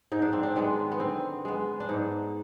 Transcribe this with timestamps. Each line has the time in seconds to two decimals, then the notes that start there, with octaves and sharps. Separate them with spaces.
0.12 G#2 D#4
0.22 D4
0.33 C4
0.43 D4
0.56 D#3 G#3 B3
0.92 B3
1.00 D3 C4
1.45 G#3 B3
1.80 D4
1.89 G#2 D#4